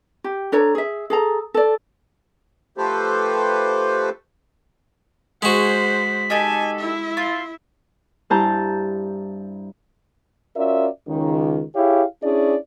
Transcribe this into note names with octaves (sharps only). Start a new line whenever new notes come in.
G4
D4 A4 C#5 A#5
G#4 E5
G#4 A4 A#5
A4 D5
F3 A3 G4 A4 B4 C5
G#3 F#4 G#4 C5 F#5 C#6 B6
D#4 G4 A4 G#5
E4 E5
F4 C6
G2 E4 C5 A5 A#5 G6
C#4 F4 F#4 A#4 D5 E5
C#2 D#3
E4 G4 G#4 C#5 F5
C#4 D4 E4 G#4 D5